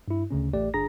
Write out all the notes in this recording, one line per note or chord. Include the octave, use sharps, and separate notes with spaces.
G2 E4
D2 C#3 C#4
A1 A3 G4 D5
G1 D4 G#4 A#5 A#6